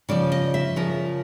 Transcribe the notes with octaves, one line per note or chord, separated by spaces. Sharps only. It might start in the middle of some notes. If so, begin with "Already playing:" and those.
C#3 F3 D5
D#5
E5
C#3 F3 A#4